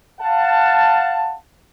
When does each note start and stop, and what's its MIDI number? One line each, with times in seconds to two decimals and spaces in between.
0.20 1.35 77
0.20 1.35 78
0.20 1.35 81